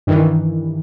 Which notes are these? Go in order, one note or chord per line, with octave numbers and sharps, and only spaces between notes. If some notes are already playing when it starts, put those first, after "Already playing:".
G2 D#3 E3